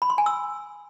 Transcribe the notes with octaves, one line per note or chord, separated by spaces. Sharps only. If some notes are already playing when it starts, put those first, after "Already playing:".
B5
C6
G#5
E6